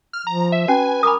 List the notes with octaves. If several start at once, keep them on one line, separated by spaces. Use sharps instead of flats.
F6
F3 A#5
E5
C#4 F#4 B4 G#5
A#4 B5 D6 D#6